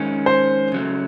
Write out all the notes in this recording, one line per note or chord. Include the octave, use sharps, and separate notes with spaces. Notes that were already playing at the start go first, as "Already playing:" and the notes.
Already playing: D#3 G#3 C#4
C5
C#3 F#3 A3